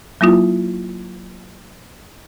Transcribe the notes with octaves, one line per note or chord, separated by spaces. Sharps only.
F#3 A#3 E4 F4